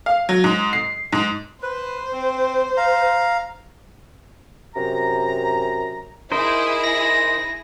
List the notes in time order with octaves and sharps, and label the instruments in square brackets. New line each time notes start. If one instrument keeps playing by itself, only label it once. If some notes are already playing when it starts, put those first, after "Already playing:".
[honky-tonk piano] F5
F#3
G#2
C7
G#2
[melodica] B4 [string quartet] C5
[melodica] C4
F5 A#5
[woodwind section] F#2 C3 A#5
[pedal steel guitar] D#4 A#4 C5 [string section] E4 G#4
[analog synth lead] A#6